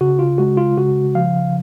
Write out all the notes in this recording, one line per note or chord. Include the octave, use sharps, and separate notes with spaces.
C#3 F#4
F4
G#3 F#4
F4
C#3 F#4
F3 F5